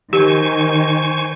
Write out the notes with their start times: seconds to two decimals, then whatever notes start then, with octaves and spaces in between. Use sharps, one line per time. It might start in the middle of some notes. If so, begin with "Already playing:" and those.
0.13 D#3 G4 C5 G#5 C#6